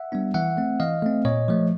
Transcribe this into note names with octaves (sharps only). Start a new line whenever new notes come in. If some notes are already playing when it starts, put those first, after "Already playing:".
Already playing: E5 F#5
G3 B3 D4
E3 E5 F#5
A3 C4
E3 D#5 F5
A3 C4
A#2 C#5 D#5
F3 A3